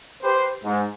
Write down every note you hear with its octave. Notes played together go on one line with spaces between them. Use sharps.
G4 B4 C5
G#2